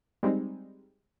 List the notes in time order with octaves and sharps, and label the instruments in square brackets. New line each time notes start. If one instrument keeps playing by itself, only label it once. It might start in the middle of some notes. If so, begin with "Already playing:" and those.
[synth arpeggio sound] G3 G#3 C4 D#4